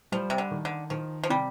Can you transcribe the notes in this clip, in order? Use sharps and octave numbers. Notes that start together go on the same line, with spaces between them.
F3 G3
C3
D3
D#3
D3
D#3 F3
F3
C3 G3